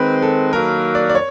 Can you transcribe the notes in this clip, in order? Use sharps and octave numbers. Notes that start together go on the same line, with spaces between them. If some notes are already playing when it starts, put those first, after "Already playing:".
Already playing: D#3 G#3 C4 B4
A4
D#3 F#3 A#3 A#4
D5
D5
C#5